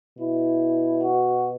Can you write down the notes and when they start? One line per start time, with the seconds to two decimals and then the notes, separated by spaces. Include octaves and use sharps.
0.18 B2 E4
1.02 F#4